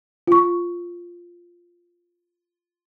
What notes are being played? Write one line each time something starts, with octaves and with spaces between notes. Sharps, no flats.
F4 C#6